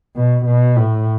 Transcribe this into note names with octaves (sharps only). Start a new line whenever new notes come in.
B2
B2
A2